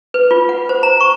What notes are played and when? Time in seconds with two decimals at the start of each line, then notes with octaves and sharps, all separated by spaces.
0.14 B4
0.31 F4
0.49 F#5
0.69 C5
0.83 A#5
1.01 C#6